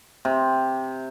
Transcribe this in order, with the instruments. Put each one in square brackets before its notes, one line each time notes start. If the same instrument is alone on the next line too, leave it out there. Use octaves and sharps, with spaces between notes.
[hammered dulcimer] C3